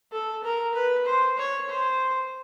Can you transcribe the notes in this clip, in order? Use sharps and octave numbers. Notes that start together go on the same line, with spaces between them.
A4
A#4
B4
C5
C#5
C5